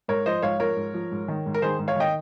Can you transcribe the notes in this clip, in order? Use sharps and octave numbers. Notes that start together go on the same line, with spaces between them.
G#2 A#4 C#5
F3 C5 D#5
G#2 C#5 F5
F3 A#4 C#5
G#2
F3
G#2
D#3
G#2
A#4
D#3 G#4 C5
G#2
C#5 F5
D#3 D#5 G5